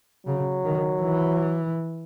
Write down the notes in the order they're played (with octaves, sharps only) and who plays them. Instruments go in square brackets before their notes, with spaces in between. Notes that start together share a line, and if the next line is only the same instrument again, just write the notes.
[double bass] C#3 [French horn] F#3
[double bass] D#3
E3